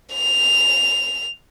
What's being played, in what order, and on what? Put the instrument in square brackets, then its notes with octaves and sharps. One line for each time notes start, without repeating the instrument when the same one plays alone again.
[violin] F7